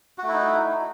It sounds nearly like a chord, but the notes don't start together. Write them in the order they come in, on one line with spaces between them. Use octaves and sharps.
F#4 A3 E4 D#4